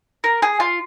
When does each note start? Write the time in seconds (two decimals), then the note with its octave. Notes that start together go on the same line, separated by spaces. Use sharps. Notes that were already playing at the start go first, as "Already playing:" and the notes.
0.24 A#4
0.42 G#4
0.60 F4